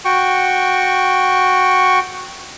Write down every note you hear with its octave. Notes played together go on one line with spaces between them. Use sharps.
F#4 G5 C#6